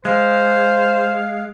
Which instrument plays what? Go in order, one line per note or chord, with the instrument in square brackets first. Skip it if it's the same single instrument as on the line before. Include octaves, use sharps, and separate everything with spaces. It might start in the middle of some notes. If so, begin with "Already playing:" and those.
[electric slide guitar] G#3 [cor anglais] C5 [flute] F5